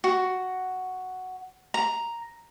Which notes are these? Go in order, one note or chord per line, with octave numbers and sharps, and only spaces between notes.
F#4
A#5